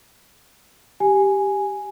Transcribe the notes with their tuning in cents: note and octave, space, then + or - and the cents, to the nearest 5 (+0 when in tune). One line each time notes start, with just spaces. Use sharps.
G4 +0 G#5 +0